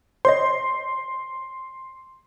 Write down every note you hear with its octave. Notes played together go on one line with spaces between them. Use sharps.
C5 C#5 D#5 C6